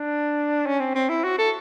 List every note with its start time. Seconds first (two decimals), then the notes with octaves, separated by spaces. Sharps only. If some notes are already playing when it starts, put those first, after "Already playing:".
Already playing: D4
0.66 C#4
0.80 C4
0.95 C4
1.09 E4
1.24 F#4
1.38 A4